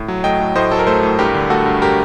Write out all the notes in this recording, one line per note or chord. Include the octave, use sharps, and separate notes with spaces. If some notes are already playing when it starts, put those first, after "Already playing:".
Already playing: A2
F#3
A3 D#5 G5
A2
A2 C5 D#5
F#3 A4
A#4
A3 A4 C5
A2
G2 G4 A#4
D3
A3 F#4 A4
G2
G4 A#4